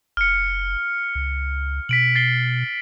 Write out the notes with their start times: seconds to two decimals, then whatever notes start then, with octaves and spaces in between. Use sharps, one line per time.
0.17 F#1 F6 C#7
1.15 C#2
1.89 B2 B6 D7 F#7
2.16 A6 C7 G7